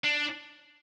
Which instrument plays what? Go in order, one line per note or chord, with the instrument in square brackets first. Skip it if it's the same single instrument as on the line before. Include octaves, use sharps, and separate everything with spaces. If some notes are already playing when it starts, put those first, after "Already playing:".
[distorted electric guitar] D4